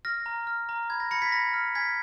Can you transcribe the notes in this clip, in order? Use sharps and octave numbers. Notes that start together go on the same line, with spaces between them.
F6 A#6
A#5
F6
A#5
B5 G#6
A#6
B5 A#6 C#7
G#6 B6
B5 A#6
F6
G#5 G#6 B6